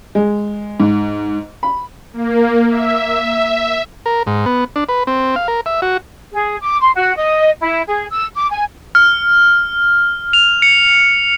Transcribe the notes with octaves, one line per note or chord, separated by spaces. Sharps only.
G#3
G#2
B5
A#3
E5
A#4
G#2
B3
D4
B4
C4
F5
A#4
E5
F#4
G#4
D6
C6
F#4
D#5
E4
G#4
E6
D6
G#5
F6
F7
C#7